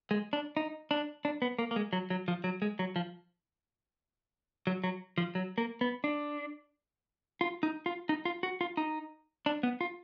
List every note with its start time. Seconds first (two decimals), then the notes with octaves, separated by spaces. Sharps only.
0.11 G#3
0.33 D4
0.57 D#4
0.91 D4
1.25 D4
1.42 B3
1.58 A#3
1.71 A#3
1.76 G#3
1.93 F#3
2.10 F#3
2.28 F3
2.44 F#3
2.62 G#3
2.79 F#3
2.96 F3
4.67 F#3
4.84 F#3
5.18 F3
5.35 F#3
5.58 A#3
5.81 B3
6.04 D4
7.41 F4
7.63 D#4
7.86 F4
8.09 D#4
8.25 F4
8.43 F#4
8.61 F4
8.77 D#4
9.46 D4
9.63 B3
9.81 F4